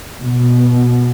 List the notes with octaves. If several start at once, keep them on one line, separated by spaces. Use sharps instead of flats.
B2